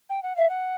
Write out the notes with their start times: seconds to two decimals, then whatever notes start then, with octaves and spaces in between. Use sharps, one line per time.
0.10 G5
0.23 F#5
0.36 E5 F5
0.49 F#5